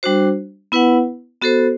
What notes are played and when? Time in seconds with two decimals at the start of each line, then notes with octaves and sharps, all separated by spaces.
0.03 G3 D4 F#4 C5
0.72 B3 E4 B4 F#5
1.41 B3 F#4 A4 C5